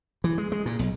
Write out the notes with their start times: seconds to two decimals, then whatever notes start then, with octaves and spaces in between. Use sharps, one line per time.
0.24 E3
0.38 G#3
0.52 G#3
0.66 A#2
0.79 B1